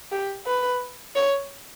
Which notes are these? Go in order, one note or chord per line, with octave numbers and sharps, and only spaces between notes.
G4
B4
C#5